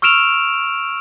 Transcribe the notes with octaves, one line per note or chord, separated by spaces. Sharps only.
C#6 E6 F6 D7 E7 F7